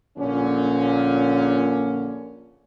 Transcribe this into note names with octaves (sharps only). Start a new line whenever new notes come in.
A#1 A#2 D3 C#4